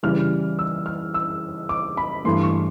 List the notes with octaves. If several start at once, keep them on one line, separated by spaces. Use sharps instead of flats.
C#3 E3 G3 F6
E6
F6
E6
D6
B5
G2 E3 A3 C6
C#6